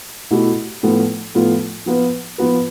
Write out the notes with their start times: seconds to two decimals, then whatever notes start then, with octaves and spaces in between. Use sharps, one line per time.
0.31 B2 A3 E4 G4
0.83 A2 F3 B3 F4 A4
1.35 A2 F3 B3 F4 A4
1.86 F3 B3 F4 B4
2.38 F3 B3 F4 B4